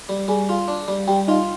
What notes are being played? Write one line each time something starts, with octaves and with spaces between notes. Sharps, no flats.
G3
G3 G#4 G#5
F4
D4
G3
G3 G4 G5
D#4 F4 D#5